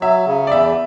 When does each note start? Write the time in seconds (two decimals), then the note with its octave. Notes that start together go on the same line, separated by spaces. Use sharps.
0.01 F#3 E5
0.26 C#3
0.47 D5
0.51 E2 E5